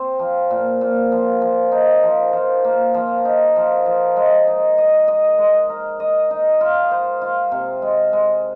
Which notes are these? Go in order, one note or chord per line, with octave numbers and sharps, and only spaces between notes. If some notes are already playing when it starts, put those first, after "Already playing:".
Already playing: C4
F3
A#2
A#2
F3
F3
D#4
F3
F3
A#3
F3
D#4
F3
F3
G#3
D#4
D#5
D#5
G#3
A#4
D#5
D#4
F4
C5
F4
C3
G#3
G#3